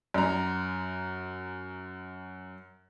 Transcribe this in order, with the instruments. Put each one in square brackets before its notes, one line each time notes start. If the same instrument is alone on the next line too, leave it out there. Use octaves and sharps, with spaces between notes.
[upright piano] F#2 A#5